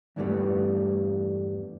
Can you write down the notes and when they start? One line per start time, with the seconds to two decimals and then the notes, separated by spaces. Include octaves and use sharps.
0.16 E2 G2 E3 G3 A3 B3